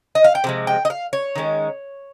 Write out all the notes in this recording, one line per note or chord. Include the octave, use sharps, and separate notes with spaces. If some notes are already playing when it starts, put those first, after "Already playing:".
D#5
F5
G5
C3 F3 G#3
G5
D#5
F5
C#5
D#3 G#3 C#4